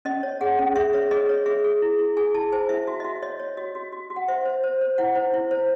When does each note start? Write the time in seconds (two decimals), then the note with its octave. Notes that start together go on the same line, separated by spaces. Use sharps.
0.05 C#4 D#5
0.23 C#5
0.41 G#4 F#5
0.59 C#4
0.76 G#4 E5
0.93 C#5 E5
1.11 G#4 D#5
1.29 C#5
1.46 G#4 E5
1.64 G#4
1.82 E4
1.99 E4
2.17 G#4 G#5
2.34 E4 A5
2.52 C5 G#5
2.69 E4 E5
2.87 F#4 E5
3.00 D#5
3.04 F#4 E5
3.22 C#5 D#5
3.40 C#5
3.57 F#4 D#5
3.75 F#4
3.92 F#4
4.10 F#4
4.16 F#5
4.28 C5 E5
4.45 C5
4.64 C5
4.81 C5
4.98 E4 F#5
5.15 C5
5.34 E4
5.51 C5